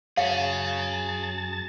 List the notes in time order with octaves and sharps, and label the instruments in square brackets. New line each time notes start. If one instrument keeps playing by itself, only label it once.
[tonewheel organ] F#2 A5 A6 [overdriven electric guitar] G#4 C#5 [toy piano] F5